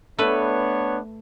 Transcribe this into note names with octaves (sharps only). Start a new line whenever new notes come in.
A3 B3 D4 B4 C#5